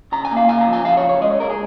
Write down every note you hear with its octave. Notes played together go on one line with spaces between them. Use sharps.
C#3 A#5
G#5
A#3
F5
C#3 G#5
A#5
F3
G#5
C#3 F5
C#5
C#3
C#5
G#3 D#5
C#5
G#3 A#4
G#4